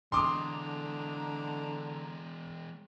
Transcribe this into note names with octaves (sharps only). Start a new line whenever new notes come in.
D3 E3 G#3 A#5 C6 D6 D#6